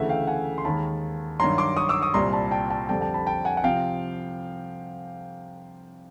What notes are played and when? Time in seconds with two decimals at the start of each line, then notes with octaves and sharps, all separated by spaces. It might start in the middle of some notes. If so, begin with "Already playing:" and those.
Already playing: D2 C#3 E3 A3 E5 F#5
0.09 F5 G5
0.27 F#5 G#5
0.58 C6
0.65 D#2 D#3 G#3 A5 B5
1.40 G2 D#3 F#3 A#5 C6
1.58 C6 D6
1.77 C#6 D#6
1.89 D6 E6
2.02 C#6 D#6
2.14 C2 A#2 G3 A#5 C6
2.33 A5 B5
2.51 G5 A5
2.70 G5 A5
2.89 F2 D3 G3 G5 A5
3.01 G5 A5
3.14 A5 B5
3.27 G5 A5
3.45 F#5 G#5
3.57 F#5
3.64 C3 F3 F5 G5